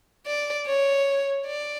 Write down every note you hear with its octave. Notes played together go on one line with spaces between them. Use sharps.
D5
C#5
D5